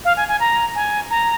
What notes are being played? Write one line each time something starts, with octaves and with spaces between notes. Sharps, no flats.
F5
G#5
G#5
A#5
G#5
A#5